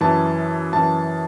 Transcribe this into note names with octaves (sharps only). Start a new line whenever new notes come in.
F#2 E3 A5
F#2 E3 A5